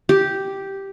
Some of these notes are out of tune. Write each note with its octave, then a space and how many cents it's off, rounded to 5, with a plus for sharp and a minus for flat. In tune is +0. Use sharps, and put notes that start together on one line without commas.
G4 -5